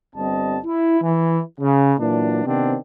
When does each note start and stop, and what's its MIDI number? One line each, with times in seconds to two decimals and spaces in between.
0.15 0.57 31
0.15 0.57 55
0.15 0.57 60
0.15 0.57 75
0.15 0.57 81
0.65 1.01 64
1.02 1.40 52
1.60 1.93 49
1.99 2.46 46
1.99 2.46 52
1.99 2.46 54
1.99 2.46 62
2.46 2.76 48
2.46 2.76 51
2.46 2.76 59
2.46 2.76 60
2.46 2.76 62